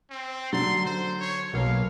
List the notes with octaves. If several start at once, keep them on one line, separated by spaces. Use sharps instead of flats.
C4
D3 F#3 C6 A6
C5
C#5
B1 A#3 F5